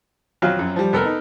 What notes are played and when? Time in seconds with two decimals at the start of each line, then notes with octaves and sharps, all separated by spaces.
0.42 F2 F#3 F5
0.59 F#2
0.76 F3 G3
0.93 F1 B3 A4 A#4
1.05 D#4